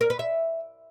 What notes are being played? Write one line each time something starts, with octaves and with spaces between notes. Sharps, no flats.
A#4
B4
E5